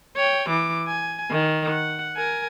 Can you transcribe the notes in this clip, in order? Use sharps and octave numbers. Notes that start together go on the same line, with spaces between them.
C#5 G5
E3 D6
G#5
D#3
F#5
A#4 G#5